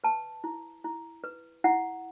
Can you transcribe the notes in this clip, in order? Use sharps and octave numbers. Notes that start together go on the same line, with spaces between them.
B4 A5
E4
E4
B4
E4 F#5